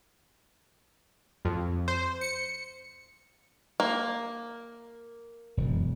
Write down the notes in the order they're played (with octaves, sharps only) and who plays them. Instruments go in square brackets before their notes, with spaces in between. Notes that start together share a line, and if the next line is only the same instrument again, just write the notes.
[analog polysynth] F2
C5
C#7
[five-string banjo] A#3
[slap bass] E1 F#2